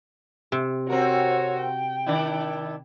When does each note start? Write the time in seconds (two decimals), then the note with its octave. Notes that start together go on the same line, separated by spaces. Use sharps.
0.52 C3
0.90 C4 F#4 A#4 C#5
1.61 G5
2.06 D#3 D4 E4